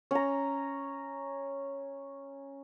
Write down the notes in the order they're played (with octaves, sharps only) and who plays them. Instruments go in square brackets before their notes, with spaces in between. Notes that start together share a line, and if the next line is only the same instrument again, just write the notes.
[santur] C#4 A#5